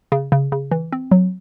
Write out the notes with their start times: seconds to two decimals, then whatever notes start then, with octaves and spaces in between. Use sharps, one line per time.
0.12 C#3
0.32 C#3
0.52 C#3
0.71 E3
0.92 C4
1.11 F#3